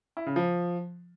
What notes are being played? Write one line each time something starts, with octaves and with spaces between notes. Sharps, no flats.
E4
C#3
F3